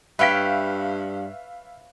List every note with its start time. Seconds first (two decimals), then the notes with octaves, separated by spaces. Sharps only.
0.19 G2 B4 C#5 E5 F5 G5 B6